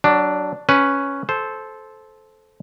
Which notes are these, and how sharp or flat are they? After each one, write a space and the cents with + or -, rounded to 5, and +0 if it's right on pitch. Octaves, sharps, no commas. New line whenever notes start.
F#3 +25 D4 +0
C#4 +0 B4 +0
A4 -15 C5 +0